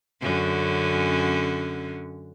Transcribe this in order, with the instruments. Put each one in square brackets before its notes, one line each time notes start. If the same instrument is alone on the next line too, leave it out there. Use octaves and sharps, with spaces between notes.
[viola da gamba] F#2 D3 C#4